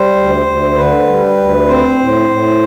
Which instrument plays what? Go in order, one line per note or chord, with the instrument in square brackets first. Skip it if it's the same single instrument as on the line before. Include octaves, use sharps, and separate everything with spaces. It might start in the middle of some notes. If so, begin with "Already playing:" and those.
Already playing: [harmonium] G3 C5
D2
D2
D3 B4
G3
D2
C4 C5
A2
A2